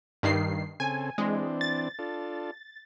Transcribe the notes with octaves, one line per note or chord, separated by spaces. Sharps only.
G2 D#3 C7
C#3 C4 A4 G#5
E3 G#3 C4 D4
A6
D4 F4 A4